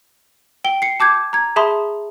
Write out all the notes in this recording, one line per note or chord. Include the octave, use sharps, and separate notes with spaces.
G5 G7
C7 C#7
A5 D6 G6 G#6
A#5 G#6
G#4 E5 A5 B5 C6 D#6